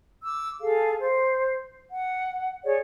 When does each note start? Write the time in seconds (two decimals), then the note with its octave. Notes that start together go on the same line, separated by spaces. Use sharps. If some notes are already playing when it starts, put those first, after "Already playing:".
0.24 D6 E6
0.60 G#4 A4 F5
0.98 C5
1.91 F#5
2.65 G#4 C#5 D5